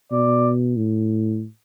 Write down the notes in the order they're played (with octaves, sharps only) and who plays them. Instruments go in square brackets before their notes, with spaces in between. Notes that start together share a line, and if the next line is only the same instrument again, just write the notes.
[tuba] B2 [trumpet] D5
[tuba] A2